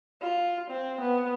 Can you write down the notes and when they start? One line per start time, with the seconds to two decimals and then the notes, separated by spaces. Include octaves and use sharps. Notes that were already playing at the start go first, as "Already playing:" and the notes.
0.21 F4
0.70 C4
1.01 B3